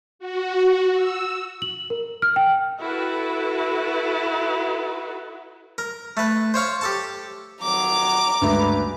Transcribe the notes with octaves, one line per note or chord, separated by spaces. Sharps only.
F#4
E6
F#7
A#4
F6
G5
E4 F#4 A4 B4
A#4
A3 B4
C5 C#5 F5 C#6
G4 A4 A5
F2 D#3 F#3 A#5 D6
D2 G2 C#3 G#3 B4